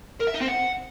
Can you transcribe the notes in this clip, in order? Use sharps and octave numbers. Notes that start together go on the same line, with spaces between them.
A#4
E5
D#4
C4
F#5